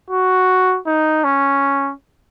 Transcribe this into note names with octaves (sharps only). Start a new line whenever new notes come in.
F#4
D#4
C#4